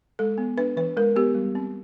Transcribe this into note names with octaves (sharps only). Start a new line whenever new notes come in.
G#3 A4
B3
D4 B4
E3 B4
G#3 A#4
B3 G4
G3
C4